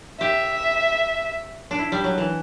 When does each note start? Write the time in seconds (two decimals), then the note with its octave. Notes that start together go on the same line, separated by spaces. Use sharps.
0.21 G4 E5
1.71 D4
1.78 E4
1.92 G3
2.04 F#3
2.18 E3